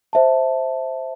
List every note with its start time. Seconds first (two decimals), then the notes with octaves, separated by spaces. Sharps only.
0.13 C5 E5 A5